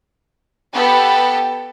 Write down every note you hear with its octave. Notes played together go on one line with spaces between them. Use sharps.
B3 G4 A4